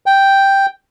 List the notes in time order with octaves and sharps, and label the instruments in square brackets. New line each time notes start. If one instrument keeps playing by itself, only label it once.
[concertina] G5